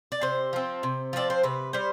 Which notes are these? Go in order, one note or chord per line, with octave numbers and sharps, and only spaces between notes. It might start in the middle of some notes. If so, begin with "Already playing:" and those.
D5
C3 C5
F3 C4
C3
F3 C4 D5
C5
C3 B4
G3 C5